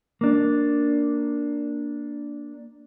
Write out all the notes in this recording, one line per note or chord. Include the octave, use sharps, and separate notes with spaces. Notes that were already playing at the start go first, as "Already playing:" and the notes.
A#3 D4